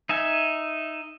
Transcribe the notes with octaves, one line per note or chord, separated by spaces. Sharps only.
D#4 E5 G#5